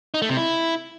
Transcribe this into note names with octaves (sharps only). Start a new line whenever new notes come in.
D#4
A3
C3
E4